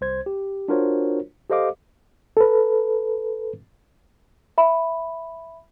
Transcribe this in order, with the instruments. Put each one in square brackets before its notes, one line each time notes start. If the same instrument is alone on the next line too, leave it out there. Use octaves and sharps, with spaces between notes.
[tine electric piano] C2 C5 G#6
G4
D4 F4 F#4 A#4 C5 C#5
G4 A4 C5 D#5 F5 D6
[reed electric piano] A4 B4
[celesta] E5 B5